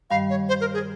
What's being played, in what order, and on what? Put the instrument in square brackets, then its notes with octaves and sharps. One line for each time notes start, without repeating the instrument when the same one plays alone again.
[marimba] G2 D#3 G3 [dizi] F5
[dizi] C#5
C5
A#4
G#4